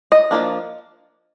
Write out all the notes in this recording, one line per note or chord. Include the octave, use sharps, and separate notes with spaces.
D#5
F3 A#3 D4